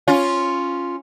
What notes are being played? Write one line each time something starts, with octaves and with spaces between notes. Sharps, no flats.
C#4 F4